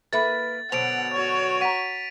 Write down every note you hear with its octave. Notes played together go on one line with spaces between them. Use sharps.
A#3 E4 A4 B4 E5 B5 A6
B2 D3 F#3 C5 F#5 D7 F7
F#4 C#5
F#5 A#5 B6 D#7